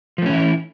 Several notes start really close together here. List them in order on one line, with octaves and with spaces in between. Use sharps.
F3 A3 C#4 E3 E4